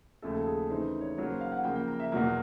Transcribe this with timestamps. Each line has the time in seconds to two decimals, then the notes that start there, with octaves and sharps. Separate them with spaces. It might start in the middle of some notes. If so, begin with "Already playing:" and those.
0.22 D#2 C#3 F3 A3 A4
0.34 A4
0.47 G#4
0.70 C#3 E3 A3 C4 D#4 C5
1.01 C#5
1.17 C#3 F#3 A#3 C#5
1.29 C5
1.41 F5
1.52 F#5
1.64 C#3 F3 A#3 G5
1.75 G5
1.88 A#5
2.00 E5
2.12 E2 B2 F#3 A#3